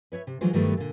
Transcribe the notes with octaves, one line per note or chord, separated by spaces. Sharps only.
B4 C#5 D5 E5
C3
D3 E3 F#3 G#3 F4 C5
G2 D#3 F#3 G3 A3 B3
A#2 D3